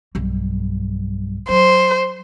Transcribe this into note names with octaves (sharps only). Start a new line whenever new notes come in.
B1 G2
F#3 C5